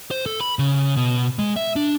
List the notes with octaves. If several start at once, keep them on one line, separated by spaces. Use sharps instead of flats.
C5
A4
B5
C#3
B2
G#3
E5
D4